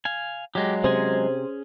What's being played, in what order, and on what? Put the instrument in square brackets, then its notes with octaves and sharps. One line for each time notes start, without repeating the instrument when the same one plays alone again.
[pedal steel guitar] F5 G#5
[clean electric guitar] F#3 G#3 [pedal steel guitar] G4
[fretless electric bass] C3 [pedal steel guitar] C#4 G#4 G#5 [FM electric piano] C5